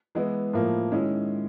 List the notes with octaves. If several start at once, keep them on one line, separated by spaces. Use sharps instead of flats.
E3 G#3 B3 E4
A2 F3 A#3
D#3 G#3 C#4 E4